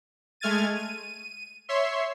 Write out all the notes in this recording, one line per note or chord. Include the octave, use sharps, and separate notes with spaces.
G#3 A3 F6 G#6 A6 D#7
D#7
C#5 E5 C6